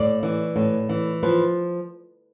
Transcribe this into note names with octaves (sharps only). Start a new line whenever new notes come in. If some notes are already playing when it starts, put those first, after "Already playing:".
Already playing: A2 D5
E3
A2
E3
F3 B4